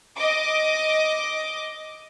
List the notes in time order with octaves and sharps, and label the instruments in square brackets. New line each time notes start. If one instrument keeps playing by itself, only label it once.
[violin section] D#5 D6